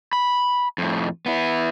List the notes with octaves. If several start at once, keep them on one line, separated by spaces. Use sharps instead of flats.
B5
F2 A2
B3 E4